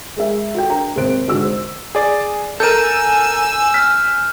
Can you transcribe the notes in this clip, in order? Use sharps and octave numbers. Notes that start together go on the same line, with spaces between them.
G#3 G#4 A#4 E5
F#4 A4 G5
D4 A#4 G5 A#5
G#1 D#2 C3 C5 F#6 D7
G#2 D3 F#4 E6
C5
G#4 D5
A4 A#4 G#5 E6 G6 D#7
F6 B6